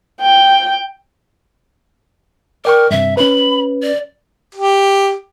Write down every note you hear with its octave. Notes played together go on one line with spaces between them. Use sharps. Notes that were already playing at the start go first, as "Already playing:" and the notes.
G5
A#4 D5 G5 C#6
G2 C3 E5
C#4 B4 B5
D5
G4